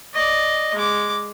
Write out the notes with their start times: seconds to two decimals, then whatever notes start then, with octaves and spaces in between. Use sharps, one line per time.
0.14 D5 D#5
0.75 G#3 D6